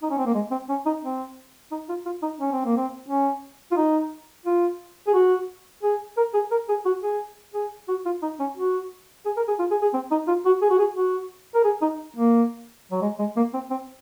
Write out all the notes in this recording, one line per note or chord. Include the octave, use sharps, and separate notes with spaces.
D#4
C#4
C4
A#3
G#3
C4
C#4
D#4
C4
D#4
F4
F4
D#4
C#4
C4
A#3
C4
C#4
F4
D#4
F4
G#4
F#4
G#4
A#4
G#4
A#4
G#4
F#4
G#4
G#4
F#4
F4
D#4
C#4
F#4
G#4
A#4
G#4
F4
G#4
G#4
C4
D#4
F4
F#4
G#4
F#4
G#4
F#4
A#4
G#4
D#4
A#3
F#3
G#3
G#3
A#3
C4
C4